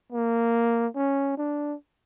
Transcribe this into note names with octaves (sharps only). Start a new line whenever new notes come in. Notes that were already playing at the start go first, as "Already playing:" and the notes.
A#3
C#4
D4